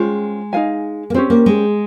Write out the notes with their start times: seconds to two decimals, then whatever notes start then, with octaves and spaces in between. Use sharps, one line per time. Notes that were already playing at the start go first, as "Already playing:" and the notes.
Already playing: G#3 C#4 F4 C5 G5
0.53 D#4 A#4 F5 G#5
1.10 A#3
1.14 C4 C#4 G4 C5
1.30 A#3
1.46 G#3